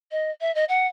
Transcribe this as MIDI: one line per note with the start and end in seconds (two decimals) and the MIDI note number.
0.11 0.30 75
0.41 0.53 76
0.55 0.64 75
0.68 0.87 78